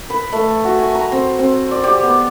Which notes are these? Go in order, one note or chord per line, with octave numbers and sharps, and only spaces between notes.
B4
A3
F#4
G#5
A#5
C4
C4
D5
G4
B3